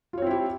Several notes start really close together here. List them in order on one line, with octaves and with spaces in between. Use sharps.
F4 C#5 C4 E4 G4